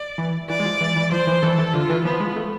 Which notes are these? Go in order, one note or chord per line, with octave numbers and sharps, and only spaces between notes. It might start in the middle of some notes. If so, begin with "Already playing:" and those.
Already playing: D5
E3
E3 D5
G#3
F3
E3
E3
F3 C5
E3
E3 A4
E3
D3 F4
E3
F3 B3
G#3
A3